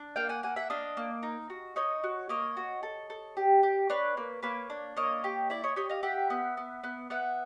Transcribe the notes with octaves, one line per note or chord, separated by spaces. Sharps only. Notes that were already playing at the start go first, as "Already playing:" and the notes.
Already playing: D4
A#3 F5 G5
F#5 G#5
A#3 F#5 G#5
E5 F#5
D4 D#5 F5
A#3
D#4
F#4
D#4 C#5 D#5
F#4
A#3 C#5 D#5
F#4
A4
A4
G4
G4
D4 B4 C#5
A#3
A#3 B4 C#5
D4
A#3 C#5 D#5
G4
E4 D5 E5
C#5 D#5
G4 C#5 D#5
D#5 F5
G4 E5 F#5
B3
B3
B3
B3 E5 F#5